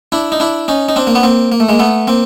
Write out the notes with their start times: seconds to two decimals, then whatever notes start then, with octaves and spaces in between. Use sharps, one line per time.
0.12 D4 E4
0.32 D#4
0.40 D4 E4
0.68 C#4 D#4
0.89 D#4
0.96 C4 D4
1.07 A#3
1.15 B3
1.23 A#3 C4
1.52 A#3
1.60 A3
1.69 G#3 A#3
1.79 A3 B3
2.07 A#3 C4